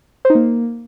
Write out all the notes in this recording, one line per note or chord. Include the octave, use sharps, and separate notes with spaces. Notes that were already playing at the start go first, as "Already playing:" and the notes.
C5
D#4
A#3